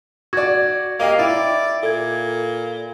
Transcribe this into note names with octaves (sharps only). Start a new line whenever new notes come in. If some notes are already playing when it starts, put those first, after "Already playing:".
F#4 D5 G#6
A#3 G4 D#5 F5
E4 D5
A#2 A4 G#6